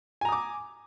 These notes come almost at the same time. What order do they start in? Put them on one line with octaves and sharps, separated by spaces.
G#5 A#5 D#6 D6